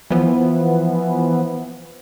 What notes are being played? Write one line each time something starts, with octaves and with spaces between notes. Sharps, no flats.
E3 F3 B3